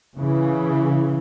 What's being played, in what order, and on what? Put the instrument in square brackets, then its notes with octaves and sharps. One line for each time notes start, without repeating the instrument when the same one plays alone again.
[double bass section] C#3 E3